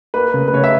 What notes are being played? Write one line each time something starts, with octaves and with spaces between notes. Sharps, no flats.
A#3 B4
C#3
B4
C#3 C#5
E5